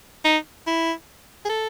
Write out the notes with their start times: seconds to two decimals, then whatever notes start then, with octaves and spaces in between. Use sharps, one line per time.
0.25 D#4
0.67 E4
1.45 G#4
1.49 A4